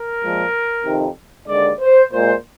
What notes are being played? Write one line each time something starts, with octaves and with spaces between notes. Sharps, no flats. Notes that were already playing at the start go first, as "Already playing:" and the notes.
Already playing: A#4
A#2 F3 G#3
F2 C3 D#3
D#2 D3 G#3 D5
C5
A#2 G#3 C5